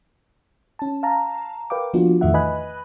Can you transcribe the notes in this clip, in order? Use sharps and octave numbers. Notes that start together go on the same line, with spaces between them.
C#4 A5
F5 A5 A#5
A#4 B4 F5 G5 D6
F3 A#3 B3 D4 F4 F#4
E2 A2 D#3 A3 E5 F#5
B4 D#5 G#5 B5 F#6